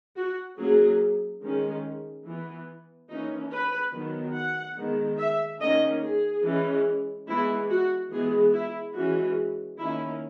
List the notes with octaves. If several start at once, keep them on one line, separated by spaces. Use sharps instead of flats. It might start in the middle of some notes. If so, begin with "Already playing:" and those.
F#4
F#3 A#3 C#4 G#4
D#3 G#3 C#4
E3 B3
E3 A#3 C#4 D#4
B4
D#3 F#3 B3
F#5
D#3 G#3 B3
E5
D#3 A#3 C#4 D#5
G#4
E3 G#3 C#4
E3 G#3 B3 E4
F#4
E3 G#3 B3 G#4
E4
E3 G#3 C#4 F#4
D#3 A#3 C#4 E4